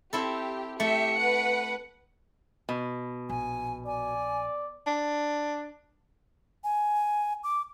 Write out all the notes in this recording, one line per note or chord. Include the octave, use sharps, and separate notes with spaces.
C4 E4 G4 A4
A3 G4 E5 C#7
B4 F#5
B2
A#1 G#5
D5 G#5
D4
G#5
D6